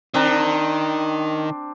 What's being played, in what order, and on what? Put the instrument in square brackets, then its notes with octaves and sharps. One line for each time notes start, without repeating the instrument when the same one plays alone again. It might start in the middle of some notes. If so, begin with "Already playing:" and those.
[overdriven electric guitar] D#3 [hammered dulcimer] C4 D4 A#5